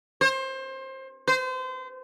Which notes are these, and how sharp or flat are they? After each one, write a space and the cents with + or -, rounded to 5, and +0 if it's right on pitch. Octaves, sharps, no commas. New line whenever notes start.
C5 +25
C5 -30